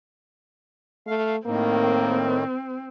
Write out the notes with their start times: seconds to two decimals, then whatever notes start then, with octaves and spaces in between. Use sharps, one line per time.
1.07 A3 F5
1.46 A2 D#3 A#3 C4